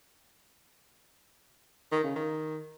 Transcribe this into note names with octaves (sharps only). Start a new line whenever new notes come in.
D#3
C#3
D#3